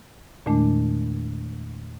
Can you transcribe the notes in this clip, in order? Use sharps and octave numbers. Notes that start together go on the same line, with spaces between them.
E2 A#2 D#3 G#3 A3 D4